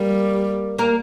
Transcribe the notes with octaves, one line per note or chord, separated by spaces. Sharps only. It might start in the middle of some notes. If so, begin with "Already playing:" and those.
Already playing: G3 A#3
A#3 A#4